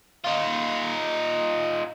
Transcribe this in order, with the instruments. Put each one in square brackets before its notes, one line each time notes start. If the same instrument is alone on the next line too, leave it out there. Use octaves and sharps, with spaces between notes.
[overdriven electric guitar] D#4 F4